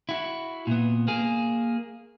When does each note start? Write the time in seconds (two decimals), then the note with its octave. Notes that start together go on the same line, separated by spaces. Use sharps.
0.09 E4 F#4
0.67 A#2 B3
1.08 A#3 G#4